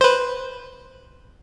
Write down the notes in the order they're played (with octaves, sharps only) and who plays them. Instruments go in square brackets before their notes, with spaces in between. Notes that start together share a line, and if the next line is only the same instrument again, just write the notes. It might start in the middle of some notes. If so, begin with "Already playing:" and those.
[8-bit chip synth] B4 C5